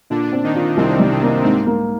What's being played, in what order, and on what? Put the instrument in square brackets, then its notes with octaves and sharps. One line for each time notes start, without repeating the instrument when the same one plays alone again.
[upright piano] A#2 [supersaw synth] D3 D4
[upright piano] C4
[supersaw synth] D#3 D#4
[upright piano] F4
[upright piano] C2 [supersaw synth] C3 C4
[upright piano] G3
[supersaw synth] C3 C4
[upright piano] A#3
[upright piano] G#2 [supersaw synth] C3 C4
[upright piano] A#3